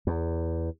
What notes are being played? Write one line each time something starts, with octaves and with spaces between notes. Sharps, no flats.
E2